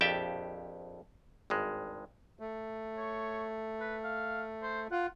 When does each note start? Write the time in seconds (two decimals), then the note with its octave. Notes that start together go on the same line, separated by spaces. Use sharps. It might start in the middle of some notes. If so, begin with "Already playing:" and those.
0.01 A#1 F2 G4 E5 G5 A5
1.50 G#1 G2 G#3
2.39 A3
2.97 C#5
3.80 B4
4.04 F5
4.62 C5
4.91 F4 F#5